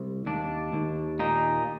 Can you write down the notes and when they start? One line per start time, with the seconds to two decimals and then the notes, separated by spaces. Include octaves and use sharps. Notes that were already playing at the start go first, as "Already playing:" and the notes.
Already playing: C2
0.26 D#2 D4
0.73 D#2
1.19 A#2 D#4